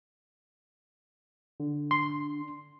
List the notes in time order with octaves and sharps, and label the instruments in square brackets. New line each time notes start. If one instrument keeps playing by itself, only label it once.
[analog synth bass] D3
[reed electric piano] C6